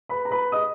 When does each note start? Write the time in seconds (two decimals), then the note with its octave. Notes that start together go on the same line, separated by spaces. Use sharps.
0.09 B4 B5
0.25 A#5
0.31 B4 B5
0.52 D#5 D#6